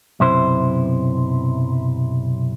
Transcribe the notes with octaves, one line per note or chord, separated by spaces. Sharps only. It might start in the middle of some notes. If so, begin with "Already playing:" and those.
B1 F#2 C3 E4 C5